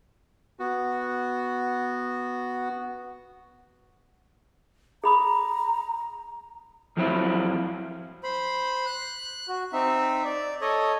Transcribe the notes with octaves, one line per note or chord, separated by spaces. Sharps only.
B3 F#4
G#4 A#5 B5 D#6
F2 F3 F#3 C4 E4
C5 B5
F#6
F#4
C4 D#4 E5
D5
A4 C#5 D#5